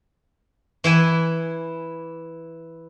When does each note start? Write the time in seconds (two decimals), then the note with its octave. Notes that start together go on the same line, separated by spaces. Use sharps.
0.84 E3 E4 G#5